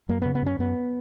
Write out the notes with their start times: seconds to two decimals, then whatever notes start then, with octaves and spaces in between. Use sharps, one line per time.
0.09 F#2 A#3
0.22 C#3 B3
0.35 B3
0.42 F#2 C#4
0.59 F#2 B3